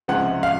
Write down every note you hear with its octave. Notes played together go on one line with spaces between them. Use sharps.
C#2 C3 F3 G#3 C#4 F#5
F5